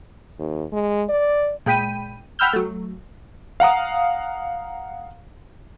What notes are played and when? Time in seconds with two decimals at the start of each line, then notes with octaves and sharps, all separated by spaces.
0.39 D#2
0.73 G#3
1.09 D5
1.66 A#2 G#3 G5 B5 D#7
2.39 F#5 G5 B5 E6 F6 G6
2.53 F#3 A3
3.60 F5 F#5 A#5 D#6